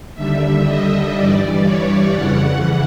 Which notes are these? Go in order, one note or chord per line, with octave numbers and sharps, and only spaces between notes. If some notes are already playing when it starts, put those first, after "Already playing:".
D#2 D3 G3 E5
D#5
G2 E3 G3 D5
C#5
F2 C#3 E3 F#5